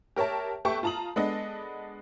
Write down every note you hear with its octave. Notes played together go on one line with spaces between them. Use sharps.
G4 A#4 C#5 E5 A5
G4 A4 B4 E5 G5 C#6
F4 A5 A#5 D#6 F#7
G#3 B3 D4 A4 D#5